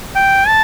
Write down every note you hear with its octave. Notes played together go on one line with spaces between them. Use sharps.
G5
A5